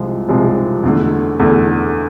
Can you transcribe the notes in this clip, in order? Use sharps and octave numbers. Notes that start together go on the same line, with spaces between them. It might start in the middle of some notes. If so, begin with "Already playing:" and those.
Already playing: C2 C3 F3 G#3
C2 C3 F3 G#3
E2 D3 A3
E2 D3 A3